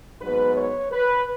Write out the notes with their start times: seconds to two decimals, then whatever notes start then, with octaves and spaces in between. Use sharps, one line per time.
0.21 G#2 F#3 B3 B4
0.56 C#5
0.92 B4